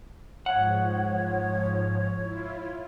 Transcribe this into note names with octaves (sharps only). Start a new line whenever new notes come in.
G#2 F3 C#5 F#5
E4 F4